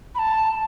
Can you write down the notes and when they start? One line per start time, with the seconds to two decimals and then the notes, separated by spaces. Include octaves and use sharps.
0.15 B5
0.19 A5